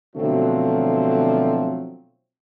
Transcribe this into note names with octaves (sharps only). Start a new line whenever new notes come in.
B2 D3 F3 F#3 A3 C4